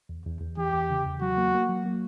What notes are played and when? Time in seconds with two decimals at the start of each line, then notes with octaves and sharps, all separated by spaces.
0.09 E2
0.26 E2
0.41 E2
0.57 E3 G4
0.73 E2
0.90 C#3
1.06 E2
1.21 F#3 F#4
1.38 A#3
1.55 A#3
1.69 F#3
1.86 A#3